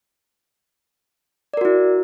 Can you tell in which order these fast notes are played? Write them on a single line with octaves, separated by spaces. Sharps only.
D5 A#4 F#4 E4